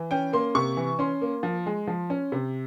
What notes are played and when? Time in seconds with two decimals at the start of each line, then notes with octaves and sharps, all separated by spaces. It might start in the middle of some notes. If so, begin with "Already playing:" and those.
Already playing: E3
0.11 C#4 G5
0.33 A#3 C6
0.55 C3 C#6
0.77 E3
0.99 C#4 C6
1.21 A#3
1.43 F3
1.66 G#3
1.87 F3
2.10 C#4
2.32 C3